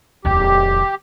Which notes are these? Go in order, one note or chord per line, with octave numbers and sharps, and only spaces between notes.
D1 E2 G4